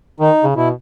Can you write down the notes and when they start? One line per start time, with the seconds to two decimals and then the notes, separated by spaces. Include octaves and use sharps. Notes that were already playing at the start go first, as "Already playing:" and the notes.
0.20 D#3 D#4
0.43 C#3
0.56 B2 E4